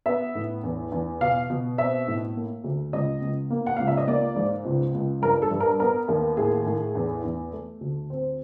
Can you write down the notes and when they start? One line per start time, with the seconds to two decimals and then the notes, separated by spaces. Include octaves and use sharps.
0.06 B3 E5
0.35 A2
0.63 E2
0.92 E2
1.21 B2 F5
1.50 B2
1.78 C4 E5
2.07 A2
2.36 A#3
2.64 D2
2.93 C#2 D#5
3.21 C#2
3.50 A#3
3.67 F#5
3.77 C#2 F5
3.87 E5
3.98 D#5
4.07 A#3 D5
4.36 G#2
4.65 C#2
4.94 C#2
5.22 G2 A#4
5.42 A4
5.51 G2
5.60 A#4
5.80 B3 A#4
6.08 D#2
6.37 A2 G#4
6.66 A2
6.95 E2
7.23 E2
7.52 A3
7.81 D2
8.10 C4